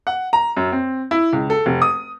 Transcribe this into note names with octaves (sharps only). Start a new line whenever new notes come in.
F#5
A#5
F#2
C4
E4
C#2
A4
F1
D#6